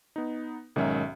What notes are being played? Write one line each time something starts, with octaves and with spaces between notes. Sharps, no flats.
B3 D#4
B1 G#2 D#3 C#4 E5